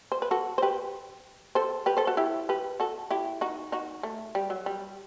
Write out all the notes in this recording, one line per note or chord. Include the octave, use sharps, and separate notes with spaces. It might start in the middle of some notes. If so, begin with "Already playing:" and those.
C5
B4
F#4 A4
C5
G4 B4
A4 C5
G4 B4
A4 C5
F#4 A4
E4 G4
G4 B4
F#4 A4
E4 G4
D#4 F#4
D#4 F#4
A3
G3
F#3
G3